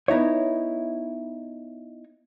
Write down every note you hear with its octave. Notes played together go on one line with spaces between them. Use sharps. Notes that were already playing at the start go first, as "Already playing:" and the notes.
B3 D#4 E4 C#5